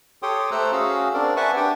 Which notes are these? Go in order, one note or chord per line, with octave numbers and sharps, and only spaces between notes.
G4 A4 C#5 G5 C6 D#6
A3 A4 C5 A#5 E6 F#6
C#4 F#4 G#4 F5 E6
C4 D4 A#4 D5
B4 E5 F#5 G#5 A5 C#6
D4 G4 G5